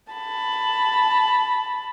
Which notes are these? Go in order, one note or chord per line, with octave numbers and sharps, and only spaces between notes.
A5 B5